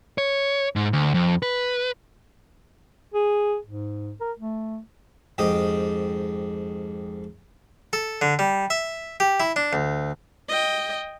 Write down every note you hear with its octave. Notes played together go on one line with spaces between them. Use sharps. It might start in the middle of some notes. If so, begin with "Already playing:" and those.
C#5
G#2
D2
F2
B4
G#4
G#2
A#4
A3
F2 G#2 G4 D#5 D#6
A4
D3
G3
E5
G4
E4
D4
D2
D#5 G5